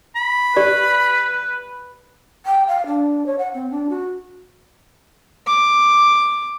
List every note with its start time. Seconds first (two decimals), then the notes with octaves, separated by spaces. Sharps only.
0.16 B5
0.56 G4 B4 D5
2.45 G5
2.68 F5
2.86 D4
3.26 C#5
3.38 F#5
3.54 C4
3.70 D4
3.89 F#4
5.47 D6